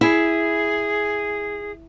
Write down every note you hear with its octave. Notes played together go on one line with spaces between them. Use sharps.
E4 G#4